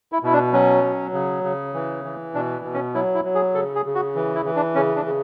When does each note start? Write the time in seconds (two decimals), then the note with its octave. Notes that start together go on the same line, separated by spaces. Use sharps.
0.12 E4
0.23 B2 E4
0.33 D4
0.53 F#3 C#4
0.83 F#3
1.14 C#3
1.44 C#3
1.74 E3
2.04 E3
2.34 B2 D4
2.65 B2
2.74 C#4
2.94 F#3 E4
3.15 E4
3.25 F#3
3.35 G#4
3.55 C#3 A4
3.75 G#4
3.86 C#3
3.95 F#4
4.15 E3
4.35 E4
4.45 E3
4.56 D4
4.75 C#3 C#4
4.96 D4
5.06 C#3